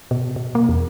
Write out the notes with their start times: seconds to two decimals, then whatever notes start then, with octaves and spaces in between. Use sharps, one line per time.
0.11 B2
0.36 B2
0.55 A#3
0.69 E2